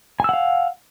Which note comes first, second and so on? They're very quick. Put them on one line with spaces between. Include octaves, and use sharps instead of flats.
G#5 E6 F#5 F5